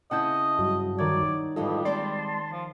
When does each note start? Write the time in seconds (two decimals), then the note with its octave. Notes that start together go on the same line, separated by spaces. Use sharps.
0.11 C#3 C4 E4 D#5 F#5 A5 G6
0.59 G2 F#3
0.98 D#3 G3 C#5 D5 G#6
1.56 F2 G#2 E3 G3 F4 A4 D#5
1.85 G#3 C4 D5 A5 C6
2.52 F3